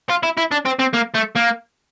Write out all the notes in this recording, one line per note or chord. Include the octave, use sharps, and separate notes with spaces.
F4
E4
E4
D4
C4
C4
A#3
A3
A#3